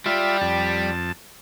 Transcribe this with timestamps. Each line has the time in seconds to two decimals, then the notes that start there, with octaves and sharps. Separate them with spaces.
0.06 G3 F4 E5
0.41 F2 A5